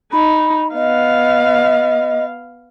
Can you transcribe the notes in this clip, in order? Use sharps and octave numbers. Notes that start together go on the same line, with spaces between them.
D#4 B5
B3 D#5 F5